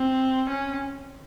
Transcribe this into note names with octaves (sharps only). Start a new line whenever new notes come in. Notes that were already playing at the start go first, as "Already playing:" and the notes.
Already playing: C4
C#4